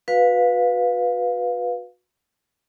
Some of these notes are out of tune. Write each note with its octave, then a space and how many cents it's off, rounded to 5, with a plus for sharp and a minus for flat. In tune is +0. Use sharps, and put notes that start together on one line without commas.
F#4 -25 B4 +0 F5 +15